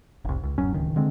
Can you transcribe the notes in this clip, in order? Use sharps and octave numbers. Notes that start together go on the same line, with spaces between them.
F1 C2
C#2
D1 F#2 F#3 C#4
D1 C#2 D#3
D3 G#3 C4